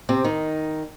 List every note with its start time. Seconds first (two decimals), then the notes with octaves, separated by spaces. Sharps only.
0.09 C3 C4
0.24 D#3 D#4